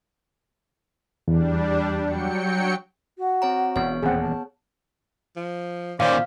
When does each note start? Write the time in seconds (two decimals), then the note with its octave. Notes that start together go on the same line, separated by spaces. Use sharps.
1.28 E2 G3 D4
2.05 F#3 G5 C#7
3.18 F#4
3.42 C4 C#5 A#5
3.76 E1 B3 C#5
4.02 D#1 E2 A#3 C4 G#4 F#5
4.21 A5
5.36 F3
6.00 A#2 D#3 C#4 C5 D5 F5